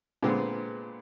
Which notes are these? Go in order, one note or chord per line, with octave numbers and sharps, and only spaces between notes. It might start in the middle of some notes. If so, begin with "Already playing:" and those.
A#2 D3 G#3 B3 C4